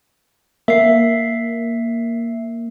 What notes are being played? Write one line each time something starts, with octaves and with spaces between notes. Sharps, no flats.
A#3 E5 C7